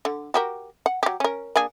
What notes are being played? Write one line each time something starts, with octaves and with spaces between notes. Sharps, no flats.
D3
F#4 G4 A#4
F#5
F#3 G4
C#4 A#4
A#3 D4 G#4